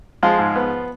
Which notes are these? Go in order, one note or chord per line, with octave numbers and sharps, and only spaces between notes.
F3 G#3 F4
G#2
B3